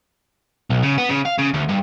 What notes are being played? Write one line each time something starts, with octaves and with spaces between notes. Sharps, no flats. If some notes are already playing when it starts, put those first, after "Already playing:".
B1
C#3
B3
C#3
F5
C#3
D2
G2